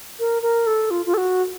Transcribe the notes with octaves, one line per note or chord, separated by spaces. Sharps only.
A#4
A#4
A4
F4
F4
A4
F#4